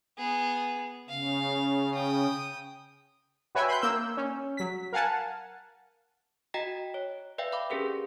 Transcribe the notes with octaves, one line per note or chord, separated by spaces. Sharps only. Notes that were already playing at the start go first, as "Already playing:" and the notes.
B3 G#4
C#3 F5
G5 D#6
F#4 B4 C#5 E5 G5 G#5
B5 C6 F#6 G6
A#3 E6 G6
C#4
F#3 B6
A#4 F5 F#5 G#5 A5
F#4 D#5 G5 A#5 A#6 B6
C#5
B4 D5 E5 F5 G5
F5 B5 D6
C#4 G4 G#4 A#4 B4